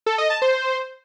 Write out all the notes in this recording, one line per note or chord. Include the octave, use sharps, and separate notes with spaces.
A4
D#5
A5
C5